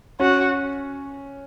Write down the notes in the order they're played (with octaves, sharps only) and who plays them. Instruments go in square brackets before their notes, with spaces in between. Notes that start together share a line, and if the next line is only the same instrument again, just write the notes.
[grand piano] C#4 [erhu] F#4